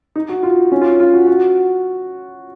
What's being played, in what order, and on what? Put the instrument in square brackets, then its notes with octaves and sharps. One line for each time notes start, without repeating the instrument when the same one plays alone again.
[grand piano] D#4
F#4
F4
C#4
F4
F4
F#4
F#4